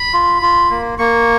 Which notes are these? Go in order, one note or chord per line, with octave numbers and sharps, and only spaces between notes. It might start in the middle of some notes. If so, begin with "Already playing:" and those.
Already playing: B5
F4
F4
A#3
A#3 C#6